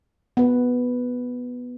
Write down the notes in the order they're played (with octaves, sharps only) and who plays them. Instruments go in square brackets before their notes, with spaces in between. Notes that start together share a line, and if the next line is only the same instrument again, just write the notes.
[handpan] B3 B4